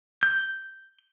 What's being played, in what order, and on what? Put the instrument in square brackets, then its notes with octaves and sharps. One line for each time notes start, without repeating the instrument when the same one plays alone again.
[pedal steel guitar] G6